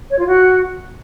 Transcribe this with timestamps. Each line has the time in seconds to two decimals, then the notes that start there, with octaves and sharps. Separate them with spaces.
0.10 C#5
0.19 F4
0.27 F#4